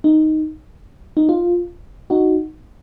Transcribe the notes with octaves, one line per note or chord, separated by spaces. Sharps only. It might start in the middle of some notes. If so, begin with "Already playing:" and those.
D#4
D#4
F4
D#4 F#4